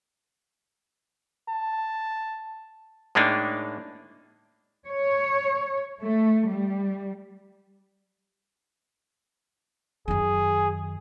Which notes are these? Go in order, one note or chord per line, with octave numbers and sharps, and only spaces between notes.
A5
A2 G#3 A#3 D4 D#4
C#5
A3
G3
F#2 D#3 G#4